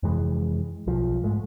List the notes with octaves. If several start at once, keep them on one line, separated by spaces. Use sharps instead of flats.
F2 C3 E3 G#3
B1 F3
G#2 G#3 A3